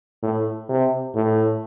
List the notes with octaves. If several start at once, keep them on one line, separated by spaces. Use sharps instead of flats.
A2
C3
A2